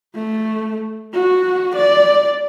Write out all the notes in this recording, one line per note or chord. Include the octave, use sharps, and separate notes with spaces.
A3
F#4
D5